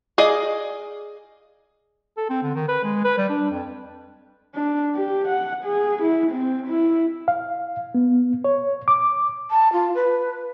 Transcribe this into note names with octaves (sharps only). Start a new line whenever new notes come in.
G#4 D5 D#5 F5
A4
C4
D3
D#3
B4
G#3
B4
G3
D4
F2
D4
G4
F#5
G#4
E4
C4
E4
F5
B3
C#5
D6
A5
F4
B4